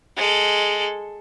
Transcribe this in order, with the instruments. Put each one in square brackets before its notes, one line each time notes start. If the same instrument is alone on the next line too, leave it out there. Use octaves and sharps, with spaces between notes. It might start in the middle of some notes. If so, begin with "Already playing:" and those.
[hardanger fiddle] G#3 A4